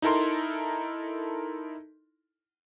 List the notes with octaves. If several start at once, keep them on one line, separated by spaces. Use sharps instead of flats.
D#4 E4 A4 A#4 C6